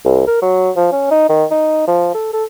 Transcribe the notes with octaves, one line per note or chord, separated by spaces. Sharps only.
C2
A#4
F#3
F3
C#4
D#4
D#3
D#4
F3
A4
A4